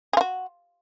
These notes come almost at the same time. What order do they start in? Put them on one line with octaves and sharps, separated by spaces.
G#4 F4 F#4